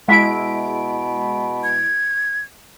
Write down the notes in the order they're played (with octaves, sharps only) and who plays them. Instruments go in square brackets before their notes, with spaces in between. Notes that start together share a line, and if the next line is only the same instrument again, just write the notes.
[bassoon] B2 [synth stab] G#3 E4 D7 [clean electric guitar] E5
[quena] G#6